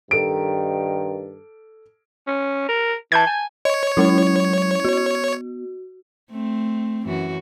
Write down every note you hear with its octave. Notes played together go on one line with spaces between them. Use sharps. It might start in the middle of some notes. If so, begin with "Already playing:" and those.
G2 D#3 A4 D7
C#4
A#4
E3 A5 G6 G#6
G#5
C#5 D#5
F#3 G#3 C#4 E4
B3 F#4
A3 C4
F#2 E3 F#4